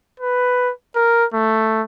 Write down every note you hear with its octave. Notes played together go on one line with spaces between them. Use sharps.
B4
A#4
A3